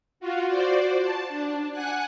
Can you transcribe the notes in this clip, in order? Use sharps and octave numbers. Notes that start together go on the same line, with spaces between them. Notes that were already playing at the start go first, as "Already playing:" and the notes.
F4 F#4
F#4 C5 D5
A5
D4
F#5 G#5 F#6